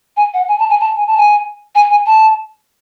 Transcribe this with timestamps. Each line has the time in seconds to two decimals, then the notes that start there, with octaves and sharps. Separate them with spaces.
0.17 G#5
0.34 F#5
0.48 G#5
0.59 A5
0.70 G#5
0.80 A5
0.96 G#5
1.07 A5
1.17 G#5
1.75 G#5
1.90 G#5
2.07 A5